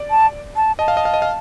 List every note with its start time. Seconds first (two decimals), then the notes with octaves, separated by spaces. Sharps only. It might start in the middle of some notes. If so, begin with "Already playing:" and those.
Already playing: D5
0.10 A5
0.56 A5
0.79 D#5 A5
0.88 F5
0.97 D#5
1.05 F5
1.14 D#5
1.22 F5